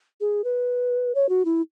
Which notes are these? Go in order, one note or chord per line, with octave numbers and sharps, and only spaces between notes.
G#4
B4
C#5
F#4
E4